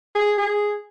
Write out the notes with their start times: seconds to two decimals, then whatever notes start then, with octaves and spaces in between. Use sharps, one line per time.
0.15 G#4
0.38 G#4